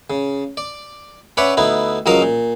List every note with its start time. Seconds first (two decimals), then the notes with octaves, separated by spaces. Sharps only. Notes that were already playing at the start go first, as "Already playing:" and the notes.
0.10 C#3
0.57 D5
1.37 C#4 B4 C#5 D5 E5 F#5
1.57 D2 B3 D#4 E4
2.06 C#2 F3 F#3 A#4 D#5 F5
2.22 A#2